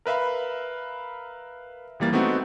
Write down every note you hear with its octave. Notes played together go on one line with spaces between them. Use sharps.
A#4 B4 E5 F5 B5
G#1 E3 G3 A#3 A6
A3 B3 C4 D#4 F#4